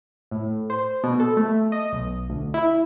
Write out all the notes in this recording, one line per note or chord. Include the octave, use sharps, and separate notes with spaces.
A2
C5
B2
A4
A3
D#5
B1
D2
E4